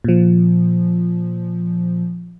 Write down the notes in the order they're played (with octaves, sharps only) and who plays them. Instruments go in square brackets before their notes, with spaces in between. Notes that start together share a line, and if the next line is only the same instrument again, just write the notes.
[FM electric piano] A#2 F3